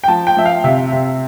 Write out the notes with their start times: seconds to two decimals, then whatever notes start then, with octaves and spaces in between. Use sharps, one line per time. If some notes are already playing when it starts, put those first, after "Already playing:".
0.04 G5
0.08 F3 A5
0.27 G5
0.37 F3 E5
0.45 F5
0.64 C3 E5
0.92 C3